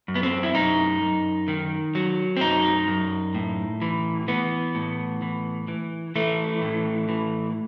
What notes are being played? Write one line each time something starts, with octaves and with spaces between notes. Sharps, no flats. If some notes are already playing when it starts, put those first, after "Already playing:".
F#2
B3
C4
E4
F#2 D#4
F#2
D#3
F#3
C4
F#2 D#4
F#2
A2
E3
E3 B3
A2
E3
E3
E3 A3
A2
E3